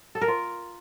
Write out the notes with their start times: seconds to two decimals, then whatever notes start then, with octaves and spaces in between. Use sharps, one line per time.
0.15 A4
0.21 A#4
0.28 F4